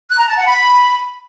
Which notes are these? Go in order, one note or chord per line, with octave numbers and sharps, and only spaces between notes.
F#6
A#5
A5
F#5
B5